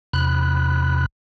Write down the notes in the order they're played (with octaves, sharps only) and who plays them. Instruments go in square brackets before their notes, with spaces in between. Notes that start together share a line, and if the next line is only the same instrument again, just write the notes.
[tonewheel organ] E2 C3 B5 F#6